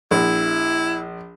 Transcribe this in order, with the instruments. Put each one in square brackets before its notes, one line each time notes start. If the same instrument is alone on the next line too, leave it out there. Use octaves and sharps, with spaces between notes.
[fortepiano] A#1 [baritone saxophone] E4